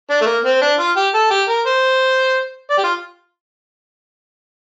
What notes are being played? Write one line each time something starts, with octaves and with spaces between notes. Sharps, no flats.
D4
A3
A#3
C4
D4
F4
G4
A4
G4
A#4
C5
D5
G4
F4